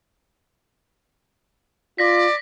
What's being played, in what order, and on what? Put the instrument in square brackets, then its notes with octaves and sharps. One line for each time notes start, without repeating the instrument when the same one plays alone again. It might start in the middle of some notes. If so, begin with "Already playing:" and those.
[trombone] F4 [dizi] D5 [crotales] A#6 B6